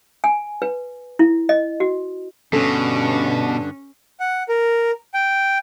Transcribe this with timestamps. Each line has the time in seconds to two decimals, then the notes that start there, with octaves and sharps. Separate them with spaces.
0.24 G#5
0.62 B4
1.19 E4
1.49 D#5
1.80 F#4
2.53 G2 B2 D3 C#4 D4 A4
4.20 F#5
4.49 A#4
5.14 G5